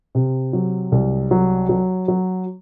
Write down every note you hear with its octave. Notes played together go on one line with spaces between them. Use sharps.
C3
F#3
C2
F#3
F#3
F#3